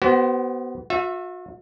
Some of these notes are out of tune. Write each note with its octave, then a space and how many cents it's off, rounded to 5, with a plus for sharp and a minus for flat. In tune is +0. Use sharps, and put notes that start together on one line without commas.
B3 +0 F#4 +45 C5 +0
F#4 -45 E5 +10